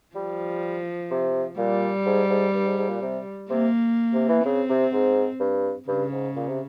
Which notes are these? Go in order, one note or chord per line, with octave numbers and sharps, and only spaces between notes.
F3 G3
C3
A#2 G3
G#2
G#2
G2
G#2
G#2
A#2
C3
C3 A#3
C3
E3
C#3 C4
C3
G#2
G2
G2 C#3
G#2
A#2
C3